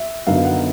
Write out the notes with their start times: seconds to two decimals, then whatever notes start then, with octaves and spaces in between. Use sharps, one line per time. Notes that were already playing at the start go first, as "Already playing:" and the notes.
Already playing: E5
0.27 F#2 D3 F#3 B3 D#4 F5
0.45 F#5